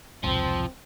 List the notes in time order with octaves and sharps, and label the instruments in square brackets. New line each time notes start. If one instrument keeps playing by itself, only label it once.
[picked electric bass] E1 C2 G#2 [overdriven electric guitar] F3 [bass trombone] C4